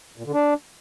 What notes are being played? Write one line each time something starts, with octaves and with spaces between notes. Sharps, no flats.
A#2
D3
D4